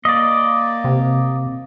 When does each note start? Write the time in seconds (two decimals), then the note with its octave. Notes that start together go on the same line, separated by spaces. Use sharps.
0.05 A#3 D5 D#5
0.84 C3